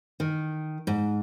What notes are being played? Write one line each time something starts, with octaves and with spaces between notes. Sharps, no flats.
D#3
G#2